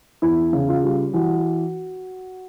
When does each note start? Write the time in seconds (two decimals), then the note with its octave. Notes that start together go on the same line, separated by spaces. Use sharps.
0.22 E2 E4
0.53 C#3
0.69 F4
0.84 G3
1.13 E3 F#4